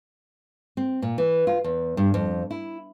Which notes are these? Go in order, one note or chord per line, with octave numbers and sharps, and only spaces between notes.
C4
A#2
E3
F4
E2
G2
F2
E4